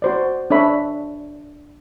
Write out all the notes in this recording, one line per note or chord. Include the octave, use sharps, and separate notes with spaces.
F#4 C5 D5
D4 A4 C#5 E5 B5